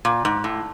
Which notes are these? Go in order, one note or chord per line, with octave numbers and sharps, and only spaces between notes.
A#2
G#2
A2